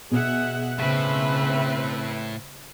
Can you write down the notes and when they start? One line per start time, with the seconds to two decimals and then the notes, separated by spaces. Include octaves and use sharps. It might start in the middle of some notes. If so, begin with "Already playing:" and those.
0.11 B2 G#4 E5 F#5
0.79 A2 C#3 C4 B4 E5